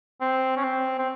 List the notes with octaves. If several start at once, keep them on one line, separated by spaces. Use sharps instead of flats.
C4
C#4
C4
C4